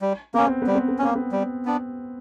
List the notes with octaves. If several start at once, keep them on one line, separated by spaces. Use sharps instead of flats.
G3
A#3 B3 C#4
C4
G3 B3
C4
B3
A#3 C4 C#4
B3
G3
B3 D4